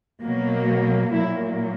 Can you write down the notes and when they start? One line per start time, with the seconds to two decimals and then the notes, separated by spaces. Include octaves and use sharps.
0.22 B2 F#3 A#3
1.12 A#2 F#3 A#3 E4